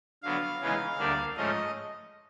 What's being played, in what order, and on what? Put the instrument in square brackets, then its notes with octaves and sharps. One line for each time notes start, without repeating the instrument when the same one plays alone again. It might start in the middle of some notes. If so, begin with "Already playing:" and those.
[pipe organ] D3 F#3 B3 F5
C#3 E3 G#3 B3 D#4
D2 D3 G3 A#3 D4
G#2 F3 A3 C#4 D#5